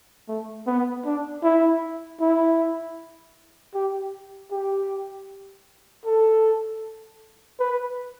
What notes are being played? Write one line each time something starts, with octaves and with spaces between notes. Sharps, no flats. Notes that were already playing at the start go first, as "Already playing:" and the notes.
A3
B3
D4
E4
E4
G4
G4
A4
B4